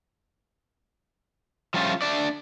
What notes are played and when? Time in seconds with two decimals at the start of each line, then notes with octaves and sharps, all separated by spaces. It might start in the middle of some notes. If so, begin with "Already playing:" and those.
1.74 F3 G3 A3 C#4 F4
2.02 A3 D4 D5